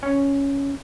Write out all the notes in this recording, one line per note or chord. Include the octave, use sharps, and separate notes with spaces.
C#4